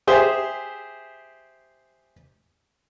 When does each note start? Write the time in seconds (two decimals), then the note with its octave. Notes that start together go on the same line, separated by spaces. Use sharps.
0.07 G4 G#4 C5 E5